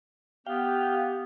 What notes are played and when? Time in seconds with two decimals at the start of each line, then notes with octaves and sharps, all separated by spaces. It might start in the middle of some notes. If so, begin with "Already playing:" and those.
0.47 B3 G4 F5 G5